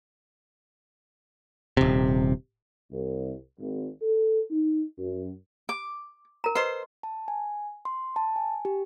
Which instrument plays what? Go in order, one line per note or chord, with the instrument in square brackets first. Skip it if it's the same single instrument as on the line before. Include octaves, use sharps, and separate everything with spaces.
[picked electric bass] D#1 C3
[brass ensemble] C2
G#1
A4
D#4
F#2
[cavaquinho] D6
[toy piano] A#4 A#5
[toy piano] B4 D#5 [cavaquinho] C5 C6
[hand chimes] A5
G#5
C6
A5
G#5
G4